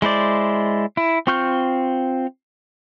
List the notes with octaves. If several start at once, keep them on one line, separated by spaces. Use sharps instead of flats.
G#3 E4 C5 D5
E4
C4 F4 C#6 F6 G6